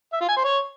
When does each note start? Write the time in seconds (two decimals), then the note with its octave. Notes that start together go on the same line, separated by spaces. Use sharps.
0.13 E5
0.21 F4
0.28 G#5
0.36 C5
0.44 C#5